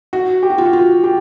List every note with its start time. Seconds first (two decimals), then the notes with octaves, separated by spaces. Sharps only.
0.13 F#4
0.43 G4
0.50 F#4
0.58 F4
0.66 F#4
0.73 F4
1.04 G4